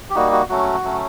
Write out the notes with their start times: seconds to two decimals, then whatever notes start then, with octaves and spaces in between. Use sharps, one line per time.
0.10 G4
0.15 G3 A#3 D#4 F#4
0.32 F#4
0.49 F#3 A3 C#4 F#4
0.84 F#3 A3 C#4